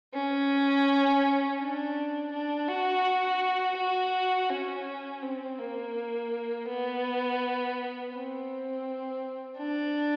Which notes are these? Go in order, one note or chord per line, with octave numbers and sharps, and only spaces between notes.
C#4
D4
D4
F#4
F#4
C#4
C4
A#3
B3
C4
D4